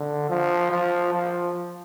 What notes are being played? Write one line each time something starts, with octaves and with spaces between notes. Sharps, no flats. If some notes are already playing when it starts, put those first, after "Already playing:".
Already playing: D3
F3
F3
F3